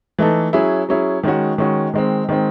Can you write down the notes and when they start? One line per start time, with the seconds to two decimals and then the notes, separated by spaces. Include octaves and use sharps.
0.18 E3 A3 D#4 A4
0.53 F#3 C#4 E4 G#4
0.89 F#3 C#4 E4 G#4
1.23 D#3 G#3 C#4 F#4
1.58 D#3 G#3 C#4 F#4
1.94 D#3 G#3 C4
2.29 D#3 G#3 C4